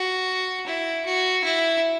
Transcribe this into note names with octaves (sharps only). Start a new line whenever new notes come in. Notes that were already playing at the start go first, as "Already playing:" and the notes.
Already playing: F#4
E4
F#4
E4